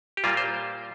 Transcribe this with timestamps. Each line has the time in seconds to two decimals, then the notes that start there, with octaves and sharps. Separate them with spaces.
0.17 G4
0.24 A#2 G3 A#3 F4
0.37 C5